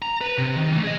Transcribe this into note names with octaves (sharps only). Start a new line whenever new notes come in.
A#5
B4
C3
D#3
E3 A3
G#4 D#5